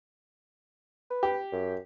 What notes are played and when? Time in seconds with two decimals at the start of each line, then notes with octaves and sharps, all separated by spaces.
1.10 B4
1.23 G4
1.52 F#2